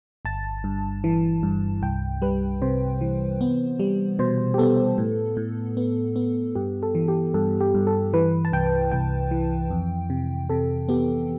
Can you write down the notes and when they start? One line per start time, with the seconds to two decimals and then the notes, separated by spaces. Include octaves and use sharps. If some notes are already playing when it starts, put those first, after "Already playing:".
0.25 G1 A5
0.64 G2
1.04 E3
1.43 G2
1.82 C2 G5
2.22 G3 B4
2.62 C3 C5
3.01 E3
3.41 B3
3.79 G3
4.19 B2 C5
4.54 G4
4.58 B3 A4
4.98 A2
5.37 A2
5.77 B3
6.16 B3
6.55 G2 G4
6.83 A4
6.95 E3
7.08 G4
7.34 G2 A4
7.61 G4
7.75 G2
7.87 A4
8.13 E3 B4
8.45 A5
8.53 C2 G5
8.92 C2 G5
9.31 E3
9.70 F2
10.10 C3
10.50 C3 A4
10.89 B3 G4